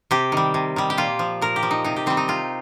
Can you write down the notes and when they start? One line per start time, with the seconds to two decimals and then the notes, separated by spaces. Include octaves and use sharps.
0.11 C3 G4
0.32 D#3 G3
0.54 C3
0.76 D#3 G3
0.90 G4
0.98 A#2 F4
1.19 F3
1.41 A#2 A#4
1.56 G4
1.63 F3
1.71 D#4
1.84 C3 D#4
1.96 G4
2.06 D#3 G3 C4
2.17 D#4
2.28 C3 F4